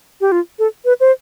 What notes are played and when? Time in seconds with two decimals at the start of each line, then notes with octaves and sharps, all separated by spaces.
0.21 G4
0.32 F4
0.59 A4
0.85 B4
1.00 C5